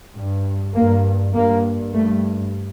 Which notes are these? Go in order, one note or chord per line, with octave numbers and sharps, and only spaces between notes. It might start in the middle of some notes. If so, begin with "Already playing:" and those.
G2
G2 A#3
G2 A#3
G2 A3